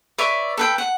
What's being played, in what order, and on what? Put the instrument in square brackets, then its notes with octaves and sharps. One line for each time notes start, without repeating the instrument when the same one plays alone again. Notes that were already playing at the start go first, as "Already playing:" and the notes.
[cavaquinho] B4 C#5 D5 E5
A4 B4 G5
F#5